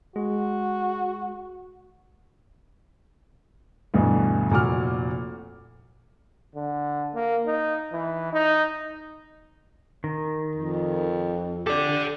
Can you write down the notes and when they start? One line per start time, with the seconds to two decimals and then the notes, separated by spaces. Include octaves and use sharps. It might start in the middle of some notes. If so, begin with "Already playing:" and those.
0.16 G#3 F#4
3.94 D2 G2 B2 D3 E3
4.51 F1 A#2 F#4 F#5 D6 F6
6.55 D3
7.14 A#3
7.46 D#4
7.92 E3
8.33 D#4
10.04 D#3
10.56 F2
11.67 G4 A4 D5